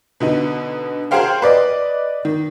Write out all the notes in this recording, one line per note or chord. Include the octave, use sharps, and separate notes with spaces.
B2 D3 D#4
F#4 G#4 A#4 C5 F5 G5
B4 D5 D#5
D#3